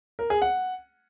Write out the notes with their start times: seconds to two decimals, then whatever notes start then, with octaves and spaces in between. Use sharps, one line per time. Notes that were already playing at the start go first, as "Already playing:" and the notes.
0.19 A#4
0.30 G#4
0.42 F#5